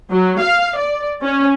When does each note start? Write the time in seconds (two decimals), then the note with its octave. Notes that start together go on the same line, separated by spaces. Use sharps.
0.11 F#3
0.41 F5
0.78 D5
1.23 C#4